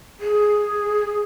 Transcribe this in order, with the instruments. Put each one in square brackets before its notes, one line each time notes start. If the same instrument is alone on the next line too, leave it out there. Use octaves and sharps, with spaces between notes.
[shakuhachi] G#4